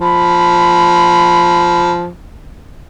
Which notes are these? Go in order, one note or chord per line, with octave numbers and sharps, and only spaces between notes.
F3 B5